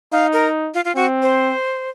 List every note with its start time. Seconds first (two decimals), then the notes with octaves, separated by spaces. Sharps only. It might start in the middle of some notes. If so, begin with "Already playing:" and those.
0.12 D#4 F5
0.33 A#4
0.74 F4
0.85 F4
0.95 C4 F#4
1.22 C5